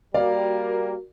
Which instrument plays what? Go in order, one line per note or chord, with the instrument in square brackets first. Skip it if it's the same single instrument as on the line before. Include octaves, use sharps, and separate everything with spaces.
[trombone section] G3 A#3 [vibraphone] F#4 A#4 [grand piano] D5 F5